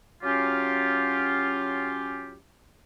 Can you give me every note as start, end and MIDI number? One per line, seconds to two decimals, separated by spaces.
0.23 2.36 54
0.23 2.36 61
0.23 2.36 65
0.23 2.36 67